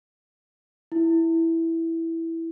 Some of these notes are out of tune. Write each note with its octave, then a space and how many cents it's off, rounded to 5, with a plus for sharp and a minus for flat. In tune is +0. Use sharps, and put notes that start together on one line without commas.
E4 +0